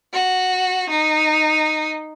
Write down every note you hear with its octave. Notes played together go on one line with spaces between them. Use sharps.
F#4
D#4